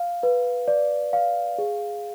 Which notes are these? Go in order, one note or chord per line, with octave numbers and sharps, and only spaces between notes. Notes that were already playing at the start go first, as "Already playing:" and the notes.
Already playing: F5
B4
D5
F5
G#4